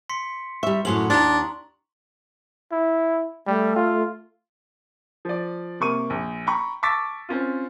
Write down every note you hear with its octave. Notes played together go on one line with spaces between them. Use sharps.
C6 B6 C#7
G3 E5 C#6
F#2 A2 F#3 C6 F#7
D#2 D4 A#5 C6
E4
G3 A3
F4
F3 D5
C3 A#3 C#6 D#7
A#1
G5 A#5 B5 C#6
A5 C#6 D6 E6 A6 B6
C4 C#4 F4